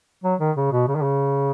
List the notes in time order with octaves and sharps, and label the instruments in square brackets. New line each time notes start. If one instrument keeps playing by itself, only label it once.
[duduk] F#3
D#3
C#3
B2
C#3
D#3
C#3